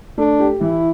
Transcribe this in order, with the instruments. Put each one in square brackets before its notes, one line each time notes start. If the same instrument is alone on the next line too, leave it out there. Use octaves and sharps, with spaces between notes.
[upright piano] A3 [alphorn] D4
[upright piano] G4
[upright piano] E3 [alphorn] E4